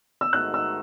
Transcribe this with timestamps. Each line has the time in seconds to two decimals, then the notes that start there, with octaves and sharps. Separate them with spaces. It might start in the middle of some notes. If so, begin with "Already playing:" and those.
0.21 E6
0.33 G#2 D#3 A3 D#4 F#4 F#6
0.54 E6